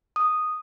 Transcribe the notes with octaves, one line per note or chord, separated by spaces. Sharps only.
D#6